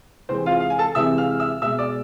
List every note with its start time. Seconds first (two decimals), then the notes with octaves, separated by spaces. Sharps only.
0.29 C3 E3 G#3 C4 C5
0.46 F4 F5
0.60 F5
0.70 G#5
0.78 A4 A5
0.95 C3 E3 G#3 E5 E6
1.18 F5 F6
1.40 E5 E6
1.62 B2 G#3 E5 E6
1.78 D5 D6